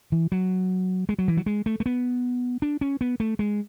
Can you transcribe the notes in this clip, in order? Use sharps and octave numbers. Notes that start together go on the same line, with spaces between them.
E3
F#3
G#3
F#3
E3
F#3
G#3
A3
A3
B3
D4
C#4
B3
A3
G#3